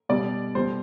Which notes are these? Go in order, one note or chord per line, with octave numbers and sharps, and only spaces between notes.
B2 G3 D5
B2 G3 C5